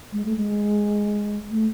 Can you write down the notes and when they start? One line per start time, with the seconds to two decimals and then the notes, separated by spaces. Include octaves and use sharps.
0.13 G#3
0.25 A3
0.36 G#3
1.51 A3